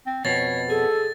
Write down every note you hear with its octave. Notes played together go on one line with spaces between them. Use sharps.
C4
F2 B2 C#5 A6
G#4 A4